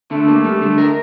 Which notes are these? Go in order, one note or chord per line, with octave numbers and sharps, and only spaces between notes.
D3 A3
A#3
G3
D3
A#4